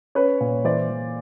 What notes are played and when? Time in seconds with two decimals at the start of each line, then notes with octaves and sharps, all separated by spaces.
0.15 C#4 B4 C#5
0.40 A#2
0.65 E3 C5 D5
0.90 E3